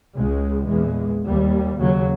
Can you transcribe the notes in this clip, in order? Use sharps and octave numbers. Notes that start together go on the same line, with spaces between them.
C#2 C#3 G#3
A#1 E2 E3 G#3
D#2 G3
D#2 C#3 F#3